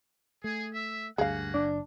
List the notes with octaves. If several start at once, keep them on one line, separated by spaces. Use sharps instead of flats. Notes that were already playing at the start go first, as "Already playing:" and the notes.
A3 G#4
E5
D2 G2 A#3 C#4 G#4 F5 F#5
F#1 D4